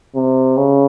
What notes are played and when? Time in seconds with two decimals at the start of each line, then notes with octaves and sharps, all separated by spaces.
0.15 C3
0.57 C#3